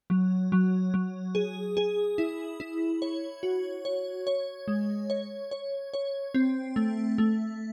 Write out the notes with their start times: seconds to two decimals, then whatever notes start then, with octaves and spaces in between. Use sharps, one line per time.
0.10 F#3
0.52 F#3
0.94 F#3
1.35 G#4
1.77 G#4
2.18 E4
2.60 E4
3.02 C#5
3.43 F#4
3.85 C#5
4.27 C#5
4.68 G#3
5.10 C#5
5.51 C#5
5.94 C#5
6.34 C4
6.76 A3
7.18 A3